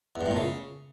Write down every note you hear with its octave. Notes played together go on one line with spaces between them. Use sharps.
E2
G2
A2
A#2
C#3